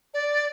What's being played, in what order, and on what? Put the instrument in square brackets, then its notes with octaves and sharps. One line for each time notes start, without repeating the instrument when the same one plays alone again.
[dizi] D5